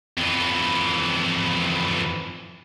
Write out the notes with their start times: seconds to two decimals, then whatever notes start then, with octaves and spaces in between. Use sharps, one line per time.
0.17 F2 E3